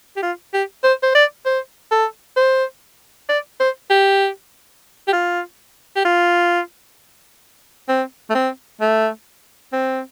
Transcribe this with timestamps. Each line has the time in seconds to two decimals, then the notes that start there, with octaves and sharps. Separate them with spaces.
0.17 G4
0.22 F4
0.54 G4
0.84 C5
1.03 C5
1.15 D5
1.46 C5
1.91 A4
2.37 C5
3.29 D5
3.60 C5
3.90 G4
5.08 G4
5.13 F4
5.96 G4
6.05 F4
7.89 C4
8.30 A3
8.35 C4
8.81 A3
9.73 C4